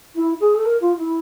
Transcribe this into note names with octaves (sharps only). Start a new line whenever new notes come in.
E4
G#4
A4
A#4
F4
E4